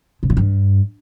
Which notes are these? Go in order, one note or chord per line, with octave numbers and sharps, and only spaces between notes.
C3
A#2
G2